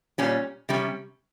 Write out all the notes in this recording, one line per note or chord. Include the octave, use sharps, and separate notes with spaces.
A#2 G3 C#4
C3 G3 C#4